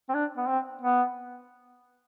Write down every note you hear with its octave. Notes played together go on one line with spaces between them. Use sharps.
C4
D4
B3
C4
B3